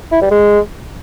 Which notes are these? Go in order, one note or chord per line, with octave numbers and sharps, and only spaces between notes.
E4
G3
G#3